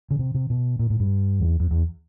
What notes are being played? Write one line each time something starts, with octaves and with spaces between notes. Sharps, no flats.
C#3
C3
C3
B2
A#2
A2
G2
E2
F2
E2